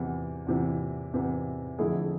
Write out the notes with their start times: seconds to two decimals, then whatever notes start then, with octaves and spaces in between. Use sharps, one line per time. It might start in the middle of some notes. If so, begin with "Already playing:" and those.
Already playing: E2 C3 E3
0.47 E2 C3 E3
1.13 E2 C3 E3
1.79 F2 D3 A3 E4 G#4